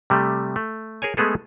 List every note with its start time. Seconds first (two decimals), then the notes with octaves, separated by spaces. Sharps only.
0.10 C3 G3 A3
0.56 A3
1.02 G#4 A#4 C#5 G#5
1.17 G#3 A3 B3 G#4 A4